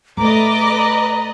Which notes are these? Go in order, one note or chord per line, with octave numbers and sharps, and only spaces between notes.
A3 B4 D5 D#5 A#5 D6